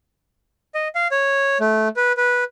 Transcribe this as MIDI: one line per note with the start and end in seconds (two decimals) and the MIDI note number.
0.74 0.88 75
0.95 1.08 77
1.11 1.58 73
1.60 1.88 57
1.96 2.12 71
2.17 2.44 71